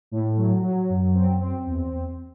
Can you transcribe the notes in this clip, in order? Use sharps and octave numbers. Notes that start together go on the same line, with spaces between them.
A2
F#3
F#3
F#2
C4
C4
E2